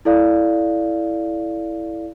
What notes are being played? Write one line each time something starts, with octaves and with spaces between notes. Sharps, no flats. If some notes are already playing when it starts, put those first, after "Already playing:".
E4 A4 D5 F5